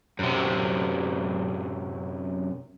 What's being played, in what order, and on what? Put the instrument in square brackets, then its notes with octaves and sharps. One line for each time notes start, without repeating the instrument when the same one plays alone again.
[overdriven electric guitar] F#2 C3